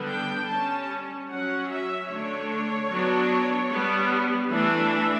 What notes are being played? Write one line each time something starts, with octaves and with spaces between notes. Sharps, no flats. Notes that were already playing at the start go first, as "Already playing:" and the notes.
Already playing: D3 G3 B3 D4
G5
G3 C#4 A5
F#3 C#4 F#5
E5
D3 A3 D4 C#5
F#3 B3 D4
G3 B3 D4
E3 A3 D4 E5